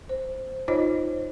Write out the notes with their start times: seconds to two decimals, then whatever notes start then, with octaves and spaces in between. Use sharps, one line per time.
0.09 C5
0.68 D#4 F4 C5 C#5 D#5